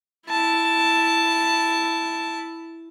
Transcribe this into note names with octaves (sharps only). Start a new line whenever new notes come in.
E4 A5